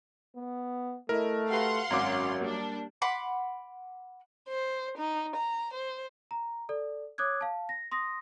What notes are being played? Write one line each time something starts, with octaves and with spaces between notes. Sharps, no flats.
B3
A3 E4 A#4 D#5
F#4 G4 B4 F5 F#5 C6
G#1 F#2 C#4 F#4 A#5 D6
G3 A#3 D4
F#5 B5 C6 D6
C5
D#4
A#5
C5
A#5
A4 D5
C#5 D6 D#6 F#6 G#6
F5 A5
A#6
C6 D#6 A#6